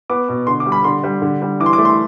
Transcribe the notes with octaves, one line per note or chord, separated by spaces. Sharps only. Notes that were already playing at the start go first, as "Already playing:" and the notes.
B3 D6
B2
D3 C6
D6
G3
B5
D3 C6
G3
D3
G3
E3 D6
C6
D6
A3
C6